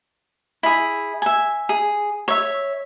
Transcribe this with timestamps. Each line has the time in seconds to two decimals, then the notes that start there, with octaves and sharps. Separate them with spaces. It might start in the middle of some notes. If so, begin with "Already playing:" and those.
0.63 E4 G#4
1.22 E5 G#5
1.69 G#4
2.28 C#5 E5